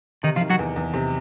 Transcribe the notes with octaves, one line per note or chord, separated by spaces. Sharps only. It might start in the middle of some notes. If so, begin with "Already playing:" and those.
C3 D#3 D#4
F3 F4
D#3
F#3 F#4
E2
E2
C3